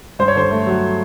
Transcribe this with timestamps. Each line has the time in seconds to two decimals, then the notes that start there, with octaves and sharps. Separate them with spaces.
0.19 G2 C5
0.28 C#5
0.36 D3 C5
0.51 A3
0.67 F#3